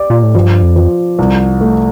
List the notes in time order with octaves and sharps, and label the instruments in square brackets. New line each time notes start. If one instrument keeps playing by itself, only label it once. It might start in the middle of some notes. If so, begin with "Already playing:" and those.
Already playing: [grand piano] G4 D5
[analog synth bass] A#2
A2
[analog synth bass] G2 [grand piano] F3
[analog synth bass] F2
[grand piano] F3
C2
A3